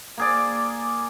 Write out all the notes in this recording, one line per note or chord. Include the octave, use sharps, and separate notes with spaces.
A#3 G#4 D5